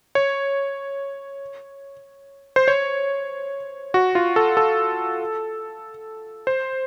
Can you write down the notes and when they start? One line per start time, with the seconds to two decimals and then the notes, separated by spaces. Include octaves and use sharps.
0.15 C#5
2.56 C5
2.68 C#5
3.94 F#4
4.15 F4
4.36 A4
4.57 A4
6.47 C5